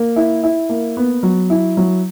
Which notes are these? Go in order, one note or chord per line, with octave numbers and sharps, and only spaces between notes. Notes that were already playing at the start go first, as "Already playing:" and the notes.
Already playing: A#3
E4
E4
A#3
B3
F#3
E4
F#3